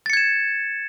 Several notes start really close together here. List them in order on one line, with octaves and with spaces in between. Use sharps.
A6 C#7 G#6 E7